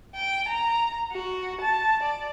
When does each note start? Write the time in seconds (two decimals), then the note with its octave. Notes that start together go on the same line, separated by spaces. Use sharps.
0.16 G5
0.48 A#5
1.12 F#4
1.61 A5
2.02 D5